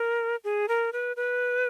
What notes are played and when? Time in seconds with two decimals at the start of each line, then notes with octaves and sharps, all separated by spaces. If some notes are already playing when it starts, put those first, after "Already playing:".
Already playing: A#4
0.44 G#4
0.68 A#4
0.93 B4
1.16 B4